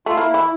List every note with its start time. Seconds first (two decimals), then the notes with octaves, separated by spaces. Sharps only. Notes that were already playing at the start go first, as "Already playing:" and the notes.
0.06 A3 F4
0.17 A#3 E4
0.34 E3